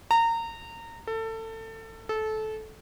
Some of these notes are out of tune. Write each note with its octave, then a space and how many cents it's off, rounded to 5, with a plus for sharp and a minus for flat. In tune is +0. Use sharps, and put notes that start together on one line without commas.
A#5 -25
A4 +25
A4 -20